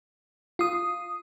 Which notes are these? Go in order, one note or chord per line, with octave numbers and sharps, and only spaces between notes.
F4 D#6